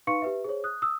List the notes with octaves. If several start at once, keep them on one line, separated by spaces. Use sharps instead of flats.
D#4 B4 F5 C6 C#6 C#7
G4 B4 E5
G#4 C5 C#5
D#6 F#6
D#6 E6